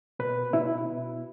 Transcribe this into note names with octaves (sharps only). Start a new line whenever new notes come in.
B2 B4
B2 E4